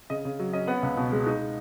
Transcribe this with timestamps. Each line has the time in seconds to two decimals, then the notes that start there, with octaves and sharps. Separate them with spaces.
0.10 C#3 D#5
0.25 C#3
0.39 F#3
0.53 C#4 D#5
0.67 B3 F#5
0.83 C#2
0.97 B2
1.12 G#3
1.26 D#4